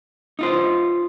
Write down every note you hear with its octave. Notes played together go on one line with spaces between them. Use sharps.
D#4 F4 C5